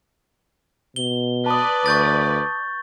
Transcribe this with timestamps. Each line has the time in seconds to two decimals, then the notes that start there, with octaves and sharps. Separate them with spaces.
0.96 B2 G7
1.46 B4 D5 A5 D#6
1.86 D2 C#6 G6 A6